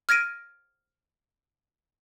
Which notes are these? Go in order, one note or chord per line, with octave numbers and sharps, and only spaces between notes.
F6 G#6 A#6 D7 D#7